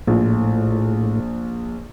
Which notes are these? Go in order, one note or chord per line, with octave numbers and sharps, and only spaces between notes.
A#1 A2